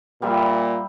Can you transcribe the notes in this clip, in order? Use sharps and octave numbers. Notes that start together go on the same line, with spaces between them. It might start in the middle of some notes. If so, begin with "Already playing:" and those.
A#2 G3 E5